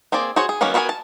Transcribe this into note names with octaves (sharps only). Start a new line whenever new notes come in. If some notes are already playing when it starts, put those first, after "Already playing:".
A#3 C4 G#4 D5
F#4 G#4 C5 C#5
G#4
D#3 F#3 A#3 B3 C#4
B3 F#4 A#4 F5 G#5
A5